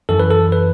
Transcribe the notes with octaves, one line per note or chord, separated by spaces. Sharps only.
F#2 E3 A4
B4
A4
B4